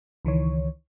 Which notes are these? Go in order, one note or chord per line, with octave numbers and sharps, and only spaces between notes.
C#2 D#3 E3 C#5